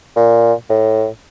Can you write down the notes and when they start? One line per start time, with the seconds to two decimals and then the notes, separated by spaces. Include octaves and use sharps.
0.16 A#2
0.70 A2